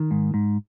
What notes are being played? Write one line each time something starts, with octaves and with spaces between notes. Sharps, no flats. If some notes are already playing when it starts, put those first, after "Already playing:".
Already playing: D#3
G#2
G#2